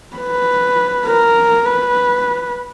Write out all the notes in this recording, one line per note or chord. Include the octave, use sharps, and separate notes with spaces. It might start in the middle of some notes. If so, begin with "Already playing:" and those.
B4
A#4
B4